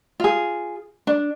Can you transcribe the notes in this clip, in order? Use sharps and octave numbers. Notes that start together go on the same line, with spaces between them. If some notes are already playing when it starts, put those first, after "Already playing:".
F4 G#4
D4